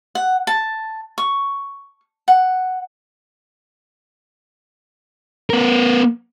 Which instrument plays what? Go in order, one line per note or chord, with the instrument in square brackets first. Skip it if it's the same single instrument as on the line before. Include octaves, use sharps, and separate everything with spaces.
[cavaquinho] F#5
A5
C#6
F#5
[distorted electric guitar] B3 A#4